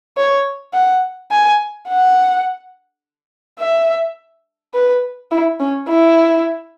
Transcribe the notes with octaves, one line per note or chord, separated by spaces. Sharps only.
C#5
F#5
G#5
F#5
E5
B4
E4
C#4
E4